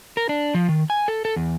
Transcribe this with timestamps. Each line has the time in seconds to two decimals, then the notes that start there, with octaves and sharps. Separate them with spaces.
0.17 A#4
0.29 D4
0.54 F3
0.69 D#3
0.90 G#5
1.08 A4
1.25 A4
1.36 E2